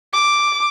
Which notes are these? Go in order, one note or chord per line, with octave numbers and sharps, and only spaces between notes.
D6